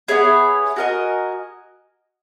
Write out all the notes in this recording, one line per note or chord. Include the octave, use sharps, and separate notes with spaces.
B3 E4 G#4 C#5
F#4 A#4 D#5 G#5